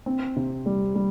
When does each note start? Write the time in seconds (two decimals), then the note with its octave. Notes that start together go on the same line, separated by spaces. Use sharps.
0.06 C4
0.36 C3
0.66 G3
0.95 G3